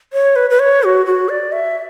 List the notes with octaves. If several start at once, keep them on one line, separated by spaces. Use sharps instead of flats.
C#5
B4
B4
C#5
F#4
F#4
D5
E5